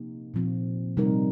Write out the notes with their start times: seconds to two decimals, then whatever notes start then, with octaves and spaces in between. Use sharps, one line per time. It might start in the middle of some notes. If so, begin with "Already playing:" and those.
Already playing: C3 F3 A#3 D#4 G4
0.34 A#2 F3 C4
0.97 C3 G3 D#4 A#4